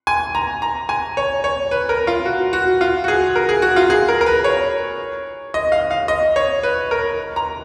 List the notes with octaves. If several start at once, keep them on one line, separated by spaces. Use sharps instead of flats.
G#5
A#5
A#5
G#5
C#5
C#5
B4
A#4
F4
F#4
F#4
F4
F#4
G#4
A#4
G#4
F#4
F4
G#4
A#4
A#4
B4
C#5
D#5
F5
F5
D#5
C#5
B4
A#4
A#5